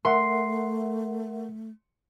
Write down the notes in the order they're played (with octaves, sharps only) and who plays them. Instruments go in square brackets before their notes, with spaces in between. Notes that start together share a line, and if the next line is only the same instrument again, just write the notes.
[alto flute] A3 [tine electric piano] A#4 E5 F#5 [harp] C6